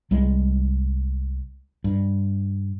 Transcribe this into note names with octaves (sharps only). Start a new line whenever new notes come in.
C2 G3 G#3
G2